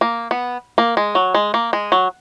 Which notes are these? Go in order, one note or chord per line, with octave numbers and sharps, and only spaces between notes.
A#3
B3
A#3
G#3
F#3
G#3
A#3
G#3
F#3